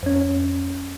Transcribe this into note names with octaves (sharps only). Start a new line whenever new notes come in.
F2 C#4